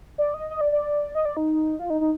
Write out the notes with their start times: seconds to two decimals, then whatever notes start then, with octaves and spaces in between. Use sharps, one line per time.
0.18 D5
0.34 D#5
0.50 D#5
0.61 D5
0.72 D5
1.15 D#5
1.25 D5
1.37 D#4
1.79 F4
1.90 D#4
2.01 D#4